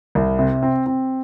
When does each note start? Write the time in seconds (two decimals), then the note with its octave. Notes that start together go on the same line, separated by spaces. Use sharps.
0.15 C2
0.39 C3
0.63 C4
0.86 C4